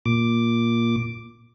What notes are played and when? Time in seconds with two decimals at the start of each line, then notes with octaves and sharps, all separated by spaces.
0.06 A#2 D6